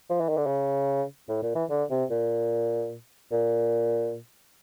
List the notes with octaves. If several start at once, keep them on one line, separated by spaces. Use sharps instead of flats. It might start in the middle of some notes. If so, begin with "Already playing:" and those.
F3
E3
D#3
D3
C#3
A2
A#2
E3
D3
C3
A#2
A#2